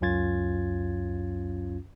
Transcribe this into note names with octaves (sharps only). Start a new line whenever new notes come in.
C#2 F#2 C#4 F4 G#6 A6